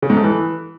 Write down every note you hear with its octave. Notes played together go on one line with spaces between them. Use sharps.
C#3
G#2
A3
E3